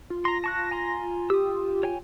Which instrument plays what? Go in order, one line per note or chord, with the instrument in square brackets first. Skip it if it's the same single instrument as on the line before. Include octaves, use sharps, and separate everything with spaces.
[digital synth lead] F4
[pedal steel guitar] A#5 C6 [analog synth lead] A#6
[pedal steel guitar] A5 C#6 F#6
G#5 A#5 C6
[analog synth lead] G4 [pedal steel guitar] D#6 E6
[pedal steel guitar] C#5 G5 G#5